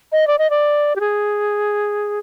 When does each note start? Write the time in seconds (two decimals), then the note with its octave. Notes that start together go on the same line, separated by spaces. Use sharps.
0.12 D#5
0.27 D5
0.39 D#5
0.50 D5
0.96 G4
1.00 G#4